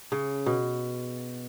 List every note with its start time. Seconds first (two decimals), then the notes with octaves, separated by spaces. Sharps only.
0.12 C#3
0.46 B2